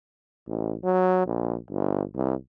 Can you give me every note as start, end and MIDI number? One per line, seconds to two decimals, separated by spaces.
0.48 0.75 33
0.84 1.24 54
1.26 1.56 34
1.70 2.03 31
2.15 2.34 36